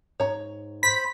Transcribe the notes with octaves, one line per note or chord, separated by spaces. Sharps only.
G#2 C#5 A#5
C5 B5 B6